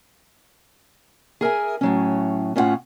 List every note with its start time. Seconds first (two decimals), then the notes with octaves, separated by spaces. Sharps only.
1.41 G#4 A#4 E5 G#5
1.81 A2 F#3 C#4
2.56 A2 C#4 E4 F4 F#5